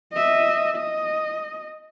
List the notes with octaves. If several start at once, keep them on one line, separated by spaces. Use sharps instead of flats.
D#5 E5
D#5